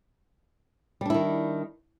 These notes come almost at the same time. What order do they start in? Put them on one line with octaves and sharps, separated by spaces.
G3 D4 E4 D#3